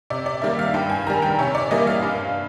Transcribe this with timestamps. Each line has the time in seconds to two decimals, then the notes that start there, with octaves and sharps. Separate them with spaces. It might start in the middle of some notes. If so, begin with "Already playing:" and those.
0.10 C3 D5
0.26 D5
0.42 D#3 G3 A#3 E5
0.59 F5
0.74 G2 G5
0.90 G#5
1.07 D#3 G3 A#5
1.22 G5
1.39 C3 C#5
1.55 D5
1.71 E3 G3 A#3 D#5
1.87 F5
2.02 G2